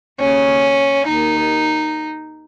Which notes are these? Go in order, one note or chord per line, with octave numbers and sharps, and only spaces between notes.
D#2 C#3 C#4
D#2 D#3 D#4